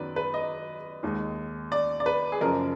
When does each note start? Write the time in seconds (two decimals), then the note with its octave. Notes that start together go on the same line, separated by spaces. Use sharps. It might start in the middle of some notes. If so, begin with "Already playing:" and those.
Already playing: F#2 D#3 F#3 B3 B4 D5
0.16 B4
0.34 D#5
1.03 D#2 D#3 G#3
1.72 D5
2.00 D5
2.06 B4
2.32 G#4
2.41 F#1 F#2 F3 A#4